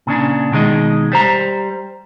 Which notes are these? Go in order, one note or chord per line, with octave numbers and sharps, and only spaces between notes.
A#2 C#3 D4
B2 D#3 G#3 D#5
G3 C5 A#5